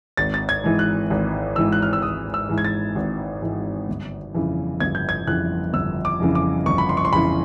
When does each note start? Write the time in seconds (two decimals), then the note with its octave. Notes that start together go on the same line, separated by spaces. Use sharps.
0.17 G#1 A6
0.34 A6
0.49 G#6
0.64 G#2 E3 G#3
0.79 F#6
1.10 G#1
1.56 G#2 E3 G#3 E6
1.72 F#6
1.82 F6
1.93 E6
2.02 G#1 D#6
2.34 E6
2.49 G#2 E3 G#3
2.58 G#6
2.65 A6
2.95 G#1
3.41 G#2 E3 G#3
3.88 G1
4.34 F2 C#3 E3
4.80 G1 G#6
4.95 G6
5.09 G#6
5.27 F2 C#3 E3 F#6
5.73 G1 E6
6.05 D6
6.20 F2 C#3 E3
6.35 D6
6.66 G1 C#6
6.78 B5
6.89 C6
6.97 C#6
7.05 C6
7.13 F2 C#3 E3 B5